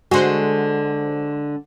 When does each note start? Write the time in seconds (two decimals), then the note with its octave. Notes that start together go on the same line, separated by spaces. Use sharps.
0.11 D3 G#3 F#4 C5